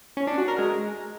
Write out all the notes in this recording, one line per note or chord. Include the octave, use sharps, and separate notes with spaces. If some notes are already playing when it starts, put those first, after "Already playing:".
C#4
D4
F#4
A#4
G#3